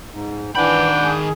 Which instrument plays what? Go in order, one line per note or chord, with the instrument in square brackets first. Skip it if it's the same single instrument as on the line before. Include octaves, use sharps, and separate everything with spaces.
[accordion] G#2
[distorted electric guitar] D#3 B5 [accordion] E3 [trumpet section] D4 F#5 G5
[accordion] G#4